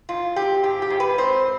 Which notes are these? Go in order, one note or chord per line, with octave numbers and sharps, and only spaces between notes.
G#2 F4
C4 G4
G#2 G4
G4
G#2
B4
C4 C5